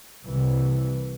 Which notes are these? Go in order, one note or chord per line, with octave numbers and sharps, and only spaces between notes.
C2 C3 E3